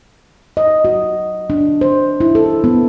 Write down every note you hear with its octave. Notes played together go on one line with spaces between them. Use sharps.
D#5
F#4
D4
C5
E4
A4
B3